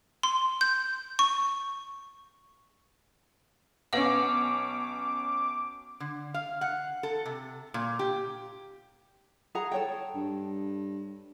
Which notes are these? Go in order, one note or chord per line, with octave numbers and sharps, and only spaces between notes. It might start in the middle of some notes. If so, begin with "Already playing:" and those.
C6
G6
C#6
B1 C#4 B4 F5 F#5 D6
D3
F5
F#5
A4
C3
A#2
G4
G#4 F#5 A#5
A4 C#5 G5
G2